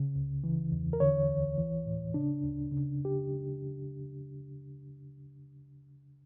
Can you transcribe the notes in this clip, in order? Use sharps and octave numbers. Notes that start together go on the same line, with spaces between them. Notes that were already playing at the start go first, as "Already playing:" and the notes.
Already playing: C#3
C#2
E3
E2
A#4
D3 C#5
D2
E3
A2
C#3 D4
D2
C#3
G4